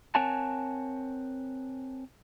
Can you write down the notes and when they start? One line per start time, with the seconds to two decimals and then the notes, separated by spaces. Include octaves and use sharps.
0.15 C4 A#4 C#5 F#5 G#5 A5